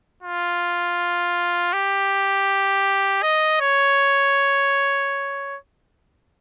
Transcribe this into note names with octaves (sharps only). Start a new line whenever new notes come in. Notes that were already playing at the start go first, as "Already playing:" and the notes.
F4
G4
D#5
C#5